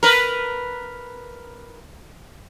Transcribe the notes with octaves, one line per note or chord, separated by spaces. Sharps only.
A#4 B4